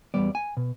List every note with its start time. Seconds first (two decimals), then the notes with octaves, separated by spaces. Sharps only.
0.14 E2 B2 G3 B3 D5
0.35 G#5
0.57 B2